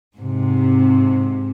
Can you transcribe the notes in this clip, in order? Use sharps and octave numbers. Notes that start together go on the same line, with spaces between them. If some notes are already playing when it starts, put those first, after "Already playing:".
G#2 C3